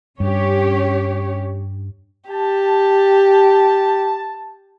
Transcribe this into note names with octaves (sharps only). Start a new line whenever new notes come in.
G2 C#4 G4 C#5
G4 A5